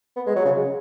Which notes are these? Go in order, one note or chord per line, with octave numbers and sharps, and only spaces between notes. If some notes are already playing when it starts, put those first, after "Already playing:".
B3
G#3
F#3
C#3